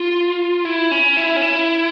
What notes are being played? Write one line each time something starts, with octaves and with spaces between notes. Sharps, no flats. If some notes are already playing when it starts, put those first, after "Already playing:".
Already playing: F4
E4
C#4
E4
C#4
E4